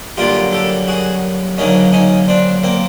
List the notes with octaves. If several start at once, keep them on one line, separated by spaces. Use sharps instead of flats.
F#2 D3 G3 A#3 F4 G4
G4 A4
F#4 G#4
D2 C#3 F#3 A#3 C#4 D#4
C#4 D#4
C4 D4
A#3 C4